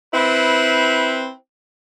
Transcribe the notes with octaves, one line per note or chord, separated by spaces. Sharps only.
C4 E4 B4